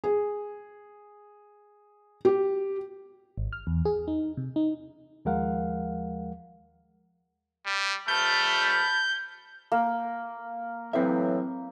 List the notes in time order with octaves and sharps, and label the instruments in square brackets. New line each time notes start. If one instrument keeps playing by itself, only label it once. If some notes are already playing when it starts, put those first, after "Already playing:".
[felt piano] G#4
G4
[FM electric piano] G#1
F6
E2
G#4
D#4
C3
D#4
[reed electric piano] D#2 F3 G#3 A#4 F5 F#5
[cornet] G3
[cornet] A3 [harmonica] A5 B5 F6 [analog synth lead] G6
[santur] A#3
[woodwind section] A2 E3 F#3 [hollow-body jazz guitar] C4 E5